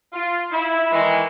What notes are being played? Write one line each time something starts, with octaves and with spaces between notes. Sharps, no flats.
F4
E4
D#3 E3 G#3